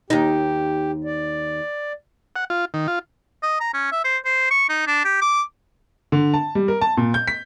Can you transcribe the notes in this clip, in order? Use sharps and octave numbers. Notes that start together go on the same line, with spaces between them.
D#2 D#4 G4
D5
F#5
F4
D#3
F4
D#5
A#5
C#4
E5
C5
C5
C#6
D#4
D4
G4
D6
D3
A5
G3
A#4
A5
A#2
G6
B6